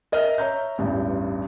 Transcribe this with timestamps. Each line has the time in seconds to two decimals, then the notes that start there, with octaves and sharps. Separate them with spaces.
0.12 A#4 D#5 E5 F6
0.38 C#5 E5 A#5 G6
0.78 A1 E2 G2